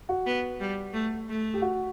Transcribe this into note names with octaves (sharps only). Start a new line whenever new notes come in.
F#4
B3
G3
A3
A3
G4
F#4